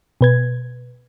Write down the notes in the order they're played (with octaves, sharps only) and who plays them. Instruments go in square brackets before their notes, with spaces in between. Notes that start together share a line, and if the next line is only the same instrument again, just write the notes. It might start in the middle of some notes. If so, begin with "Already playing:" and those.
[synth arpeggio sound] B2 B4 G#6